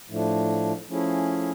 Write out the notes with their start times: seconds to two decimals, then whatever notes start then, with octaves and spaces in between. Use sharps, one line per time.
0.08 A2 F3 A3 D4
0.88 F3 A3 C#4 E4 G#4